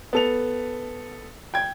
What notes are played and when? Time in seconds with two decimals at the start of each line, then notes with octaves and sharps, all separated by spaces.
0.13 B3 A4 F7
1.54 G5 G#6